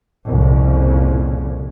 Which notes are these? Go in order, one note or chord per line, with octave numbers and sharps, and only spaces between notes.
C2 F2 A#2 C#3